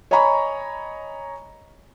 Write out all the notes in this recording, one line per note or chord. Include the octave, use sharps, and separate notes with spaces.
C#5 D#5 G#5 A#5 B5 C#6